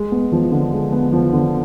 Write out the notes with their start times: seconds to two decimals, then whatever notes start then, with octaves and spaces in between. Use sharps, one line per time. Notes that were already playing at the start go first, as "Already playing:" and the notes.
Already playing: G#3
0.12 B3
0.32 F3
0.52 D3
0.73 G#3
0.92 B3
1.12 F3
1.33 D3